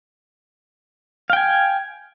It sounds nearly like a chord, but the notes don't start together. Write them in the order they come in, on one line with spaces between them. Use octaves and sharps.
F5 G5 G#5